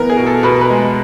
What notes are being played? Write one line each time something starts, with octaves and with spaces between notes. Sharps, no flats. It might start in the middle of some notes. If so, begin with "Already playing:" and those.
Already playing: E3 B3 A#4
G#4
B2
A4
B2 B4
B4
G#3